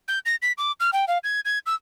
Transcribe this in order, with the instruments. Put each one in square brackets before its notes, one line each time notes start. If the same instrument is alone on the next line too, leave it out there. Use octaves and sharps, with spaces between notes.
[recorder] G6
A#6
B6
D6
F6
G5
F5
G#6
G#6
E6